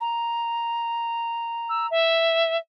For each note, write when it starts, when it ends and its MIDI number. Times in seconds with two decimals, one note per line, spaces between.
0.01 1.89 82
1.69 1.87 88
1.91 2.57 76